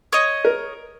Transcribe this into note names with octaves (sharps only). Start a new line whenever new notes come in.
C#5 D#5
A#4